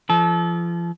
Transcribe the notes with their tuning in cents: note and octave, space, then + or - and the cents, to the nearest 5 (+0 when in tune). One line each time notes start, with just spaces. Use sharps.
F3 -35 A4 -30